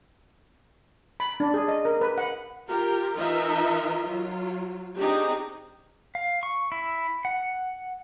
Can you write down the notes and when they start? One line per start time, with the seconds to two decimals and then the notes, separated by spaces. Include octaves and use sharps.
1.20 B5
1.40 D4
1.54 G#4
1.68 D#5
1.85 A#4
2.01 B4
2.18 F#5
2.68 F4 G4 A#4
3.16 E3 D#4 F4 A#4 D#5 E5
4.06 F#3 F4
4.98 C4 D4 D#4 G4 G#4
6.15 F5
6.43 C#6
6.72 E4
7.25 F#5